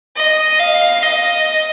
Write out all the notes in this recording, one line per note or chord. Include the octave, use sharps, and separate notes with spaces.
D#5
F5
D#5